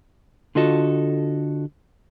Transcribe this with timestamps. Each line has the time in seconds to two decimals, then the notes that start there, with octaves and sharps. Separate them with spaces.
0.55 D3 F4 F#4 A4 D#5 A5